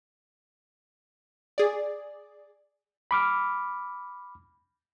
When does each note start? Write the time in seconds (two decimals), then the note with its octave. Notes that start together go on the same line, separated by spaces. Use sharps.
1.58 G#4 D5
3.11 B5 D6 F6